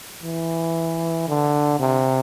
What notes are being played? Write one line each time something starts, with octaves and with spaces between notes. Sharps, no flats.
E3
D3
C3